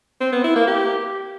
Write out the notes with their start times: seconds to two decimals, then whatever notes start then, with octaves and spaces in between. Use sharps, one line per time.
0.21 C4
0.32 B3
0.44 E4
0.56 A#3
0.67 G4